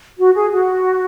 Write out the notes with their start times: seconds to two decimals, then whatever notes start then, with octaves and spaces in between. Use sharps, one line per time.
0.18 F#4
0.35 G#4
0.53 F#4